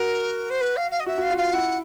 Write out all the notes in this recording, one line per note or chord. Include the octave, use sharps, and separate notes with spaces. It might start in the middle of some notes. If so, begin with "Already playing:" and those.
Already playing: F#4 A#4
C5
B4
F5
F5
D#5
F#4 E5
F#4 F5
F4
F5
E4 F#5